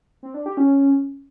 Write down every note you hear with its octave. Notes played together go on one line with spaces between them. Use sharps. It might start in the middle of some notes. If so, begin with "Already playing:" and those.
C4
D4
G4
C#4